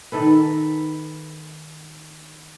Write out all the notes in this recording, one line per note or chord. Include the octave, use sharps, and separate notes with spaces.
D#3 A4 B4